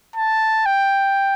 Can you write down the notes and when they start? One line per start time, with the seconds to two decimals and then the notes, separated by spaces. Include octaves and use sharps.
0.16 A5
0.66 G5